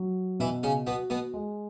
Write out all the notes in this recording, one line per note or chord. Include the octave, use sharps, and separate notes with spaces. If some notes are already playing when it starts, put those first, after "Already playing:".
Already playing: F#3
B2 E3 E4
C#3 C#4
B2 B3 F#4
B2 B3
G#3